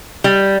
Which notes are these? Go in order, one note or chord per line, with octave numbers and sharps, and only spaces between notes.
G3